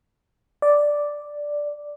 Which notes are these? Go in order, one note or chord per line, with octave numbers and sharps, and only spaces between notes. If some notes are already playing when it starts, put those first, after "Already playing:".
D5